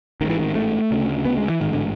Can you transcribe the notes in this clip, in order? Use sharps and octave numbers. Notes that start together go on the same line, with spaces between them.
A1 G#2 D#3 E3
D#3
A3
D2 C#3
B3
G#3
E3
A1 G#2 D#3
D3